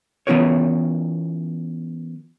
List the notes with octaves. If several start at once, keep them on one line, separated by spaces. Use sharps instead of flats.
E3 B3 C#4 F4 A#4 C#5